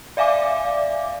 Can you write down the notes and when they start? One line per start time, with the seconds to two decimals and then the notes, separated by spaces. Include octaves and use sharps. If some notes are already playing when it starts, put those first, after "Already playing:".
0.17 D5 E5 F5 G#5 D6